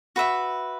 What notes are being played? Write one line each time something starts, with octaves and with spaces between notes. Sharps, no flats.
F#4 B4 E5 B5